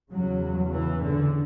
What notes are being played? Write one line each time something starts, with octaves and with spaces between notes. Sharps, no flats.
E2 C#3 F#3
E3
D3